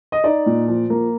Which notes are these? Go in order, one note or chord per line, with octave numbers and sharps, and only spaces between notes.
D#5
D#4 D5
A#2
F3
A#3